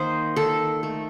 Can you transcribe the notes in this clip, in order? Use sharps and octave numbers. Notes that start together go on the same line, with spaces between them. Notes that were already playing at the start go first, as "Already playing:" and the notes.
Already playing: D#3 A#3 C5 D#5
D#3 A4
A3